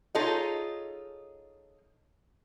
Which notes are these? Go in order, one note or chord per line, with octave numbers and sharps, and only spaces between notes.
D#4 F4 G#4 A4 C#5 D#5